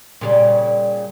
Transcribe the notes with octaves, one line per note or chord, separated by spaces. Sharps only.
A#2 C#3 G3